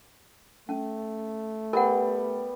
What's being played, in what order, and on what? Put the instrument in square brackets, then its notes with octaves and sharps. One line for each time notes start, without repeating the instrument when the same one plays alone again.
[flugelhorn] A3 [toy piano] C#4
[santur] G3 B3 [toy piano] A#4 F#5